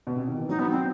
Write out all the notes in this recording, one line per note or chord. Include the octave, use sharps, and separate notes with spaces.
B2
C3
D#3
E3
F#3 D#4
B3
C4